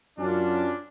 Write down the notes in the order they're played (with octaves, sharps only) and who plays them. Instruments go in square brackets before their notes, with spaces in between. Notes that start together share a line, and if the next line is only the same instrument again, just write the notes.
[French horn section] F#2 F#3 [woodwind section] C#4 [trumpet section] D4 [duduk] F4